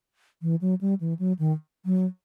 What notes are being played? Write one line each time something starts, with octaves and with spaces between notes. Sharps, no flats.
E3
F#3
G3
E3
F#3
D#3
F#3